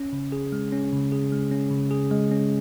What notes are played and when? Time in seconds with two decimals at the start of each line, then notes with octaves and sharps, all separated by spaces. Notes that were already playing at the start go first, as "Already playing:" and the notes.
Already playing: C#4
0.13 C#3
0.32 G#4
0.52 G#3
0.72 C#4
0.93 C#3
1.12 G#4
1.32 G#3
1.51 C#4
1.71 C#3
1.91 G#4
2.11 G#3
2.31 C#4